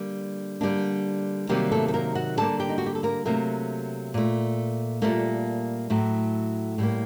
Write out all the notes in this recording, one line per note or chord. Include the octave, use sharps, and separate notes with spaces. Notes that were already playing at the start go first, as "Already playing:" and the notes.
Already playing: D3 G3 A#3
D3 G3 A#3 D4
C3 D#3 F#3 G3 A#3 G4
A3 A4
A4
A#3 A#4
F#4 F#5
D3 G3 A#3 A4 A5
G4 G5
D#4
F#4
G4
A4
A#3 A#4
C3 F#3 A3 A#3 A#4
A#2 A3
A#2 G3 A3 A#3 A4
A2 F#3 A3
A2 G3 A#3